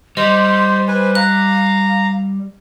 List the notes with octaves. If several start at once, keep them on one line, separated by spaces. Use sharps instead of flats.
G3 C5 D#5 C6
B4 C5 G#5
F5 A#5 F#6